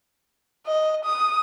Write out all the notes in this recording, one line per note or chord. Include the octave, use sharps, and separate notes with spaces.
D#5
D#6